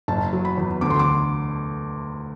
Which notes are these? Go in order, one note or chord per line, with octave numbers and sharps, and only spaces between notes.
F#1 A5
F#3
B5
E2
D2 D6
C6
D6